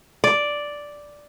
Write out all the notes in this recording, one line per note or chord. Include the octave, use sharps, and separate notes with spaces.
D5